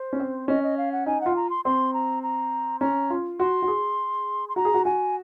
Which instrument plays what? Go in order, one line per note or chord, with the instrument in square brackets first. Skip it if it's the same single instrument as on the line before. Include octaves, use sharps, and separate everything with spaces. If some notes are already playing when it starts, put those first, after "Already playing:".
Already playing: [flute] C5
[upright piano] C#4
C4
[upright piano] C#4 [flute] D#5
[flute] D#5
F5
F#5
[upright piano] D#4 [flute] G#5
[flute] F#5
[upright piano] F4
[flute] A#5
C6
[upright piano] C4 [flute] C6
[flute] A#5
A#5
[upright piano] C#4 [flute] A#5
[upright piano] F4
[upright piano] F#4 [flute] C6
[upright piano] F#4
G#4
[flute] C6
[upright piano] F#4 [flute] A#5
[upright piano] G#4
F#4
[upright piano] F#4 [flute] G#5